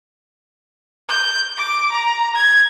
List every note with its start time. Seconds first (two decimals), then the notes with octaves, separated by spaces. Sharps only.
1.09 G6
1.57 D6
1.92 A#5
2.36 G#6